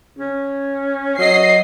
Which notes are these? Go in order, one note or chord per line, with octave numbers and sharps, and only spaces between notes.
C#4
F#3 D#5 C7